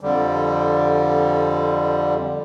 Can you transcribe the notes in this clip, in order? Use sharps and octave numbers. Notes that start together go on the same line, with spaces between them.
F2 D3 G3